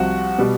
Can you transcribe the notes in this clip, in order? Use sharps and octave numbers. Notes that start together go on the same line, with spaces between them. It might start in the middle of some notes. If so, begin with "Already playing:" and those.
Already playing: C2 C3 F3 F#4
B2 G3